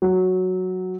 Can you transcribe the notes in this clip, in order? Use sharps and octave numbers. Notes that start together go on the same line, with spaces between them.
F#3